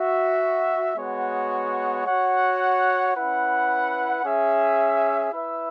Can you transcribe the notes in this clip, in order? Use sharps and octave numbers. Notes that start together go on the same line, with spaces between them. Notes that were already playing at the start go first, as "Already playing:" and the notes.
Already playing: F#4 E5
G#3 B3 F#4 C#5 F#5
F#4 C#5 F#5
C#4 E4 B4 F#5
C#4 G#4 E5
E4 B4 E5